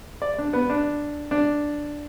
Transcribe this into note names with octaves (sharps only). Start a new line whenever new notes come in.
D5
D4
B3
D4
D4